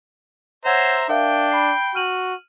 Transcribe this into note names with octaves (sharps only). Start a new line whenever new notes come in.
C5 C#5 E5 F#5 A#5 G#6
D4 A#4 E5 F5 G5
B5 C7
F#4 F6 D#7 F#7